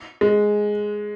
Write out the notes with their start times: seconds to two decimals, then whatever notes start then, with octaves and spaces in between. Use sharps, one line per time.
0.21 G#3